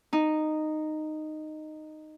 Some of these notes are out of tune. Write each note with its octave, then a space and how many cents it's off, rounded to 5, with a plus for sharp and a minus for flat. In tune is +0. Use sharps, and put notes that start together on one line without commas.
D#4 -10